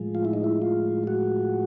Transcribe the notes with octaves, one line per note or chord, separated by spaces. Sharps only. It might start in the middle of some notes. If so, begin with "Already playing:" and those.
Already playing: A2 F3 G#3
F4
E4
D#4
E4
F4
F#4